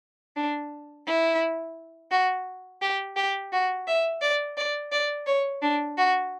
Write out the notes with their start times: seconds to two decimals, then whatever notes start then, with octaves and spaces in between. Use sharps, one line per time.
0.36 D4
1.07 E4
2.11 F#4
2.81 G4
3.16 G4
3.52 F#4
3.87 E5
4.22 D5
4.57 D5
4.92 D5
5.26 C#5
5.62 D4
5.98 F#4